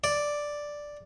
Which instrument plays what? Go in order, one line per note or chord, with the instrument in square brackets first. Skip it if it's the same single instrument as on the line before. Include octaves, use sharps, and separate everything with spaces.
[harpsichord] D5